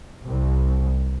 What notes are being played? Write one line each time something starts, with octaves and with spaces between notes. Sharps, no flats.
C2